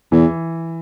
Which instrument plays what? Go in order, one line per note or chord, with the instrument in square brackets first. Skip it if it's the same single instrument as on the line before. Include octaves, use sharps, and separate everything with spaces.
[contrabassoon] E2 [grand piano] E3